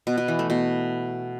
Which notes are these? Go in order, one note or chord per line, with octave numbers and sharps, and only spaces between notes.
B2
B2
E3
A3
B2